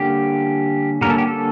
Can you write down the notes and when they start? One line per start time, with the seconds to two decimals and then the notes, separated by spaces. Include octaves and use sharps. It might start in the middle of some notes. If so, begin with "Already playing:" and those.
Already playing: D3 G3 A#3 C#4 G4
1.01 D3 G3 A#3 C#4 A#4
1.10 A4
1.18 G4
1.27 A4